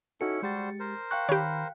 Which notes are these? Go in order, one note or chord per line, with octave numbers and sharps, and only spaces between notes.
C#4 D#4 E4 F#4 A4 C#7
G3 G#3 F#4 G4 C5 A6
A#4 C5
F5 G5 C#6 F#6
D#3 G4 C#5 B5